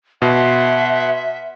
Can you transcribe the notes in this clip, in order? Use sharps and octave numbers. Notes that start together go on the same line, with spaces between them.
B2 E5 F#5 C6